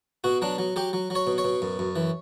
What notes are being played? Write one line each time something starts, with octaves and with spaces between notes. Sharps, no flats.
B2 F#4
F#3 D4
F#3
F#3 G4
F#3
F#3
C#5
B2
C#5
B2
F#2
F#2
E3